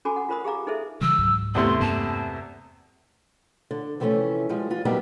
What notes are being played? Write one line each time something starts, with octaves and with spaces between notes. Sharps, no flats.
C#4 F#4 A4 G#5 B5 D6
F#5
F4 A#4 C5 B5 D#6
G4 G#4 F5 A#5 D6
D#4 G#4 A4 B4 C5 E5
C#3 E3 G3 E6
C#2 G#2 F#3
E2 C3 A3 C6
G2 A#3 B3 A5
D3
C3 E3 F3 A3 C#4
F3 G3 G#3
E3 F4
F#3 G3 A#3 B3 D#4 G4